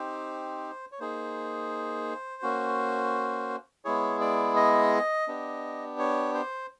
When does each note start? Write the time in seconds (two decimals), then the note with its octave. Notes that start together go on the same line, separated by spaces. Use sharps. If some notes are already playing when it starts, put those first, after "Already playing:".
Already playing: C4 D#4 G4 C5
0.92 C#5
1.00 A#3 D#4 G#4 C5
2.42 A#3 C#4 F#4
3.85 G#3 B3 E4 G#4 C#5
4.21 D5
4.56 D#5
5.28 B3 D4 G4
5.99 C#5
6.34 C5